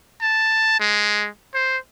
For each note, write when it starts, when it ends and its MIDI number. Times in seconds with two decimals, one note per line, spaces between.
0.21 0.80 81
0.80 1.28 56
1.54 1.78 72